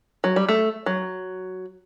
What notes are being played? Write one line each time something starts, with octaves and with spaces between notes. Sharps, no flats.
F#3
G3
A3
F#3